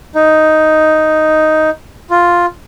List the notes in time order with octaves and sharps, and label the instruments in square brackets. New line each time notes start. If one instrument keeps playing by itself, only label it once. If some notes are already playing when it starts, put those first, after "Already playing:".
[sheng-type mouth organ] D#4
F4